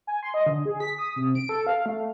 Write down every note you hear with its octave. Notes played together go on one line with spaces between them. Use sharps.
G#5
C6
D#5
D3
G#4
B6
D#6
C3
D7
A4
F5
A3